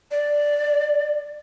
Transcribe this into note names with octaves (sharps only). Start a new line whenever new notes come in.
D5